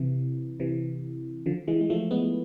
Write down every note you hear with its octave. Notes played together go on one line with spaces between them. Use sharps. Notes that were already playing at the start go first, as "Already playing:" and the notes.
Already playing: C3 E3
C3 E3
D3 F3
E3 G#3
G#3
F3 A3
G#3 B3